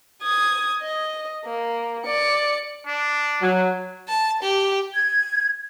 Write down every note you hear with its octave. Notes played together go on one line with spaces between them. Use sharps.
D#6 G#6
D#5
A#3
D5 C#7
D4
F#3
A5
G4
G#6